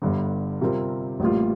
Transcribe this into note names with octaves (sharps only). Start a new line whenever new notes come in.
G1 G2 D3
C3 G3 C4 F4 A#4
A1 A2 G3 A#3 F4